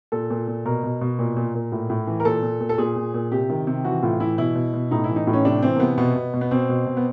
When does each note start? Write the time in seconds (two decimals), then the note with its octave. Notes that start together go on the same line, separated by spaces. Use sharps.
0.12 A#2 A4
0.30 A#2
0.48 A#2
0.65 B2 A#4
0.83 B2
1.01 B2
1.19 A#2
1.37 A#2
1.55 A#2
1.72 A2
1.90 A2
2.07 E3
2.20 A#4
2.25 A#2 A4
2.43 A#2
2.60 A#2
2.69 A4
2.78 A#2 G#4
2.96 A#2
3.14 A#2
3.32 C3 G4
3.50 D#3
3.67 C3
3.85 E3 F#4
4.02 A2 F4
4.20 E3 E4
4.38 B2 E4
4.55 B2
4.73 B2
4.91 A2 D#4
5.04 E4
5.09 E3
5.16 D#4
5.27 A2
5.33 C#4
5.45 C3 D4
5.62 E3 C4
5.76 A#3
5.80 C3 B3
5.98 B2 B3
6.16 B2
6.34 B2
6.41 B3
6.51 B2 C4
6.69 B2
6.86 B2
6.97 B3